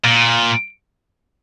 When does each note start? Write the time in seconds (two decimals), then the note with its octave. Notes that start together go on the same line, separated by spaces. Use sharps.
0.04 A#2